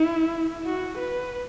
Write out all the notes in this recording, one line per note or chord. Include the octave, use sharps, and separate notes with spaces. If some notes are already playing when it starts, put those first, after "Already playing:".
Already playing: E4
F#4
B4